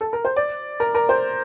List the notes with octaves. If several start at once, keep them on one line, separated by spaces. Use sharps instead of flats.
A4
A#4
C5
D5
A#4
A#4
C5